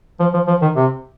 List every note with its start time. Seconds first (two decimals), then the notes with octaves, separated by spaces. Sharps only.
0.20 F3
0.34 F3
0.47 F3
0.62 D#3
0.76 C3